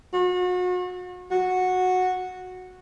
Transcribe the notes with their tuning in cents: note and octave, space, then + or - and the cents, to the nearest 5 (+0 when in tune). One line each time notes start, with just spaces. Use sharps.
F#4 -40
F#4 -10